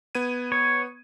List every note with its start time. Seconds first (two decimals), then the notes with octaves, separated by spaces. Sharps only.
0.15 B3 G#6 D#7
0.52 C#5